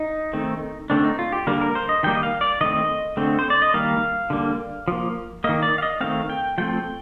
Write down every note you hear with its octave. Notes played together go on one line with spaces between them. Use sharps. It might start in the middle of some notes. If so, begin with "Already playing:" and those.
Already playing: D#4
D#3 A3 C4
D3 A3 C4 D4
D#4
F4
G4
D3 G3 A#3 A#4
A#4
C5
D#5
D#3 G3 A#3 G5
D#5
F5
D5
D#3 A3 C4 D#5
D3 A3 C4
C5
D5
D#5
D#3 G3 A#3 F5
D3 G3 A#3
F3 A#3
D#3 A#3 D#5
D5
F5
D#5
D#3 A3 C4 F5
G5
F3 A3 C4 G5